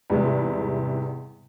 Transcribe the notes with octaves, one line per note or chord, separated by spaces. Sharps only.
E2 G#2 C3 G3 G#3